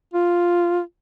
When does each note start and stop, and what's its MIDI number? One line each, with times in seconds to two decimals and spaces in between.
0.14 0.81 65